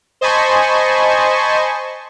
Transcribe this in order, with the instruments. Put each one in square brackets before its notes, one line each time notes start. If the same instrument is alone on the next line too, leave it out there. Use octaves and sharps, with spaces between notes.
[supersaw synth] C5 D#5 G#5 A5 B5 C#6